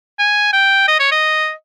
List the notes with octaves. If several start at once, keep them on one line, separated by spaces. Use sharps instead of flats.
G#5
G5
D#5
C#5
D#5